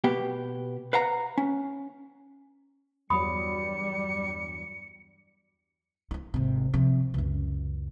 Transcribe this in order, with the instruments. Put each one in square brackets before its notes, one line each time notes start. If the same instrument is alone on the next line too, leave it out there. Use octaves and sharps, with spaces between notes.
[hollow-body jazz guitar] B2 B3 G4
B4 F5 F#5 A#5
C#4
[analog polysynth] E2 G2 F#3 [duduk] G3 [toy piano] B5 D#6 [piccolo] C#7
[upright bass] D#4 F4
G#1 C3
C3 F3
C#2 F#2